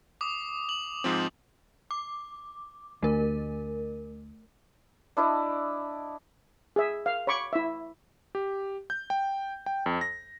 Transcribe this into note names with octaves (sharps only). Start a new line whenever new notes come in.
D6 D#6
F#7
G#2 F3 C4
D6
D2 A3 A#4
D4 E4 D5 D#5
G#4 E5
F5
C#5 B5 C#6 D6
E4 E5
G4
G6
G5
G5
F2
A#6